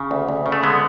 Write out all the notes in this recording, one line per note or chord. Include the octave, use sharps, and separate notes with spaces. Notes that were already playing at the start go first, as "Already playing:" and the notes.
Already playing: C#3
D2
D2
C#3
A3
D3 G#3 B3